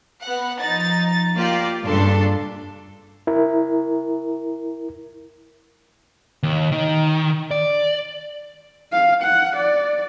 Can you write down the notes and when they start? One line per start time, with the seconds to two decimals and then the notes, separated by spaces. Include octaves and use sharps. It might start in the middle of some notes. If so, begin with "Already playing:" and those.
0.23 B3 F#5
0.60 F3 D#4 A6
1.35 A#3 F4 G4 D5
1.83 G2 A#2 C#3 D4 A4 C6
3.27 E4 A#4
6.43 D#2
6.72 D#3
7.51 D5
8.92 F5
9.22 F#5
9.56 D5